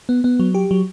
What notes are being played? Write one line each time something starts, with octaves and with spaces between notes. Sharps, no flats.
B3
B3
F#3
G4
F#3